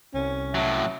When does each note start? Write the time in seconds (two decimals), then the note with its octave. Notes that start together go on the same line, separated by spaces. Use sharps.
0.14 C2 C#4
0.55 A2 F#3 E5